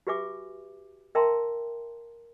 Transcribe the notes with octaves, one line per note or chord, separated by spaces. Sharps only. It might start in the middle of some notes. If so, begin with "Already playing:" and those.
F#4 G4 B4 E5 G#5 D6
A#4 E5 G5 A5 A#5 C6